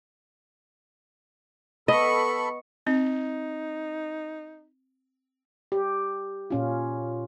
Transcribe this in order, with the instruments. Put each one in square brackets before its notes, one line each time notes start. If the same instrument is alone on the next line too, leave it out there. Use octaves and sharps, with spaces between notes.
[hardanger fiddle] B3 C#6 [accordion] A4 B5 [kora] D#5
[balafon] C4 [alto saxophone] D#4
[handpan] G4
A#2 C#4 F4